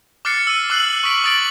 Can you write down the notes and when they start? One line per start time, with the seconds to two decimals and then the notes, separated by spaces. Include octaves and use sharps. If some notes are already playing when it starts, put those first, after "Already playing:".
0.25 D6 F6 F#6 A6 C7 C#7
0.47 E6 D#7
0.70 D6 E6 F#6 C7 D#7 F#7
1.03 C#6 D#6 B6 D7 F#7
1.23 D6 D#6 A6 D7 F#7